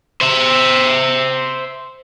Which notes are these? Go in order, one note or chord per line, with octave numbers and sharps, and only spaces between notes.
C5 E5